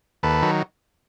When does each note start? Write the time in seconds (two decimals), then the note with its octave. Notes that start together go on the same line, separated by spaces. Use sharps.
0.23 D#2 A4 B4
0.43 D#3 F#3